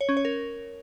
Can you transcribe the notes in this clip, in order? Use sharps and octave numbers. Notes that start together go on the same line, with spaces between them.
C#5
C#4
C#5
A#4